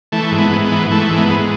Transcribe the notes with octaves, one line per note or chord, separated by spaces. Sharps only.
E3 A3
G#2
B3
G#2
B3
E3
E3 A3
G#2
B3
G#2